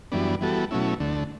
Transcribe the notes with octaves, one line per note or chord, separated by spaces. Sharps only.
F#2 E3 G3 B3 D4
E3 G3 B3 F#4 A4
B2 F#3 A3 C#4 E4
D2 D3 A3